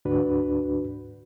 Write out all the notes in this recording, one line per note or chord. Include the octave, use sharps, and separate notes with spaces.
D2 G#2 D4 F#4 B4